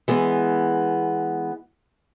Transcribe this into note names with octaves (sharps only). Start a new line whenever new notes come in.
E3 G#3 B3